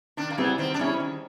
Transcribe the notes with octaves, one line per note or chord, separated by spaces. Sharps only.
D#3 D4
A#3
G3 B3 C4 E4 G#4
D#3 C4
D4
G3 C4 C#4 E4 G#4
D#3